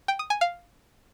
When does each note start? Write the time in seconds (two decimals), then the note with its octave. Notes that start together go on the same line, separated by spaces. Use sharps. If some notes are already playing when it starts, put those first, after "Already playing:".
0.08 G5
0.19 D#6
0.30 G#5
0.41 F5